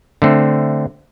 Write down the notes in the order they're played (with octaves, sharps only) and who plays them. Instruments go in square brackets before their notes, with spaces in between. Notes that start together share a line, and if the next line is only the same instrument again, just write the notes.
[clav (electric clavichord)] D3 A3 C4